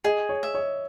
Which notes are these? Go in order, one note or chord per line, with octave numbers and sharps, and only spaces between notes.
G#4 D#5
C#5
E5
C#5